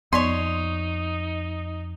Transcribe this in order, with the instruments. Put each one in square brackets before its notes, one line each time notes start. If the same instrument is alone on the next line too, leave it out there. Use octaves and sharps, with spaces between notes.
[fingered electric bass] F2 [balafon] B3 D5 [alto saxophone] D#4 [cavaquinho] C#5 C6